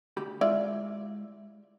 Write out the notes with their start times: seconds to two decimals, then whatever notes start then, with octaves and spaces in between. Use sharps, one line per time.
0.17 D2 G4 B5
0.41 G#3 E4 F4 D5